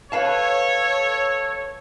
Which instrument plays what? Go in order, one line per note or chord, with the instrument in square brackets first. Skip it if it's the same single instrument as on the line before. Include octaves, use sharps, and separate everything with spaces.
[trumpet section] A4 C#5 [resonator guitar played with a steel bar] B4 F5 A5